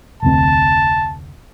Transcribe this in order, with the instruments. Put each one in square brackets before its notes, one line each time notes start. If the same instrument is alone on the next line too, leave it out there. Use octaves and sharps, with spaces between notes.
[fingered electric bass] F1 D2 C4 [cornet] A5